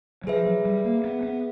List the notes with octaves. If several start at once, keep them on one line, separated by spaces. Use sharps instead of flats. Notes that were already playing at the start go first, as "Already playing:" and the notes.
F#3
F3 G#4 B4 E5
F#3
G3
A#3
B3
B3